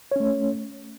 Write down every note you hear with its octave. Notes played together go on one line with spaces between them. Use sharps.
A3 C#4 C#5